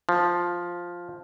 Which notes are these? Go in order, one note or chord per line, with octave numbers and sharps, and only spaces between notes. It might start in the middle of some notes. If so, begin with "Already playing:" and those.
F3